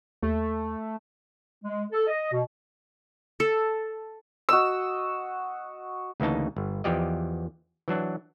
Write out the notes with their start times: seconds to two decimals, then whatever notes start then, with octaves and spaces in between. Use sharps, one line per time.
0.23 D#2 A3
1.64 G#3
1.92 A4
2.07 D#5
2.32 B2
3.40 A4
4.49 F#4 D#5 E6
6.20 D2 C#3 E3 A#3 D#4 A5
6.57 G1
6.84 E2 E3 F3 G4 D5 D#5
7.88 E3 F#3 D4